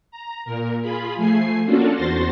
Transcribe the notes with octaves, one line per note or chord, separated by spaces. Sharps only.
A#5
A#2 A#4
F4 G#4 B5
F3 A3 G#5 C7
A#3 C#4 D4 F4 F#4 A4
E2 F#4 C5 C6 A6 A#6